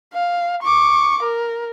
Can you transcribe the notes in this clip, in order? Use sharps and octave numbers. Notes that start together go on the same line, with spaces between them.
F5
C#6 D6
A#4